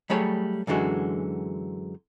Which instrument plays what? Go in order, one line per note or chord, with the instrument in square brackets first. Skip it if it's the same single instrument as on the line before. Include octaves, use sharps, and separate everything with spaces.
[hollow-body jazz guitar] F#3 G3 A3 G#4 C#5 B5
F#2 D3 E3 G#3 F#4